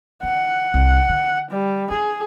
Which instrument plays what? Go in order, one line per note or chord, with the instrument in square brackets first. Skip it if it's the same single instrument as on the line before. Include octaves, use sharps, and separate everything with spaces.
[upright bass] D3 [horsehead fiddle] F#5
[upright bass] C2
D3
[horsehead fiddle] G3
[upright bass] D4 [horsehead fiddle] G#4